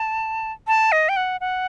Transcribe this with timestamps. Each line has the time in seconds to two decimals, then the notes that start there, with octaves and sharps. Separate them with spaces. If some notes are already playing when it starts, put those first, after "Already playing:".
Already playing: A5
0.67 A5
0.92 D#5
1.09 G5
1.16 F#5
1.41 F#5